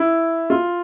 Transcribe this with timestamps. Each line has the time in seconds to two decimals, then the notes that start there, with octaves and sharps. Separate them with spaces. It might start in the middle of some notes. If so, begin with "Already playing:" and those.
Already playing: E4
0.50 F4